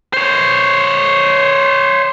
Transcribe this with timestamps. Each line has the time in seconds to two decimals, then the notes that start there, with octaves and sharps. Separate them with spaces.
0.13 C5 C#5